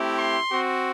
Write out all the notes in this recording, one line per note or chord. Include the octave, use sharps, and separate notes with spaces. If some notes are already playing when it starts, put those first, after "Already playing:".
Already playing: A3 C4 E4 G4
C6
C4 F#4